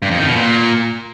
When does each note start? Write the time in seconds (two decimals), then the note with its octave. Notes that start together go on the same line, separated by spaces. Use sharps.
0.02 G2
0.11 F2
0.19 D#3
0.27 B2
0.36 A#2